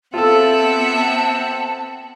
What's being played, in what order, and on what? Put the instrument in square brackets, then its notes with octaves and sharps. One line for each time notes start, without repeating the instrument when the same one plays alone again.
[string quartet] B3 E5 F#5 [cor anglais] C4 [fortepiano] F4 A4 [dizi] A5